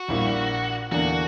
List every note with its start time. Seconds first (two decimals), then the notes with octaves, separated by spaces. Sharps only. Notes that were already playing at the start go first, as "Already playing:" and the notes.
Already playing: F#4
0.08 A#1 A#2 G3 A#3 E4
0.91 E2 D3 A#3 D4 F#4